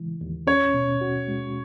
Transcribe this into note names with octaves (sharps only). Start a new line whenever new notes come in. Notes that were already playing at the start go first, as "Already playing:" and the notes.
Already playing: D#2 C#3 E3 G#3
D#2
C#4 C#5
B2
F#4
G#3